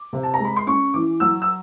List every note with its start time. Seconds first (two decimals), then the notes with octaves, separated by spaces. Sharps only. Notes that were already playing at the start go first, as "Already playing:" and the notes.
Already playing: D6
0.13 C3
0.23 A5
0.34 A#5
0.40 G#3 B5
0.56 C6
0.67 C#4 C#6
0.94 E3 D6
1.20 F#3 E6
1.42 E6